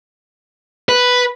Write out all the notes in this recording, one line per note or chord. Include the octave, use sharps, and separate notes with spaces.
B4